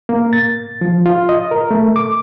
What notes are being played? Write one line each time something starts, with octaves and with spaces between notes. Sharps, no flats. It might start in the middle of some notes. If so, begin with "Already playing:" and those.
A#3
A6
F3
F4
D#5
A#4
A3
D6